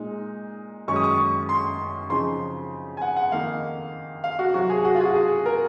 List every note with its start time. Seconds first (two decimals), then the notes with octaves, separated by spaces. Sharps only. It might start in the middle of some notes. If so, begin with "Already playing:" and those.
Already playing: A#2 G#3 D#4
0.88 F#2 D#3 G#3 C#4 C#6
0.96 D#6
1.04 C#6
1.49 C6
2.10 C#3 F3 C4 D#4 C6
2.97 G#5
3.02 F#5
3.17 F#5
3.32 F2 D#3 A#3 D#4 F5
4.24 F5
4.39 F#4
4.54 C3 F#3 C4 F#4
4.70 G#4
4.85 F#4
4.95 F4
5.00 G#4
5.05 F#4
5.15 G#4
5.46 A#4